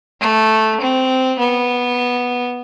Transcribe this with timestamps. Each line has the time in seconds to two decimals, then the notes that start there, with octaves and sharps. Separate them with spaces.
0.21 A3
0.81 C4
1.39 B3